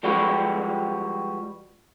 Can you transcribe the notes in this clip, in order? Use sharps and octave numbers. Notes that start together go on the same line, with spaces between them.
F3 G3 G#3 F#4 G4 B4